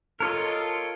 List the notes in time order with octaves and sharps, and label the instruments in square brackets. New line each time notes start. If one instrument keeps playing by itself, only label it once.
[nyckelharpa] F4 [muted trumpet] A4 [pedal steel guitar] A#4 C#5 D#5